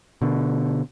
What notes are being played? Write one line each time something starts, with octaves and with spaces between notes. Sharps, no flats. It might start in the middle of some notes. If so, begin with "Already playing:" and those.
B2 D3